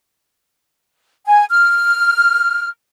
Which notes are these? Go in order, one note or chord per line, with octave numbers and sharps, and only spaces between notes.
G#5
F6